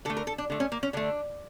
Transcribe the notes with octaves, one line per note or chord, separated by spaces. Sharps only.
D3 A3 A4
A#4
A4
D4
D3 A3
C#4
A#3
C#4
D3 A3 D4